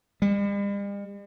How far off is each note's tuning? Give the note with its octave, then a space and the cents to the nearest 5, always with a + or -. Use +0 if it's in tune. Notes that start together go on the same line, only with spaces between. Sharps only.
G3 +45